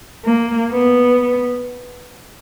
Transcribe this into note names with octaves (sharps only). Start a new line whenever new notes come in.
A#3
B3